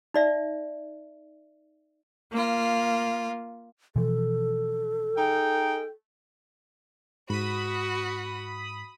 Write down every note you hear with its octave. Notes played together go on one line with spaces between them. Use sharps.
D#4 D5 E5
A#3 F4
B2 E3 F3 A4
D#4 G#4 G5
G#2 F#4 B5 D#6